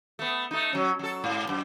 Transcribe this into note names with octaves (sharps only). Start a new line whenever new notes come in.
A3 B3
A3 D#4
F#3 C#4
F#3 A4
G#2
F#2